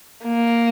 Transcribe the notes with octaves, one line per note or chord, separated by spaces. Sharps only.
A#3